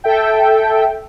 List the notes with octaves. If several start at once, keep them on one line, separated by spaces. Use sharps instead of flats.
A4 E5 G5